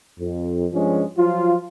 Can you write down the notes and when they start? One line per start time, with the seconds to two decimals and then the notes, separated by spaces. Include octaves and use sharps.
0.20 F2
0.73 G2 F3 G#3 C#4
1.18 F3 F#3 F4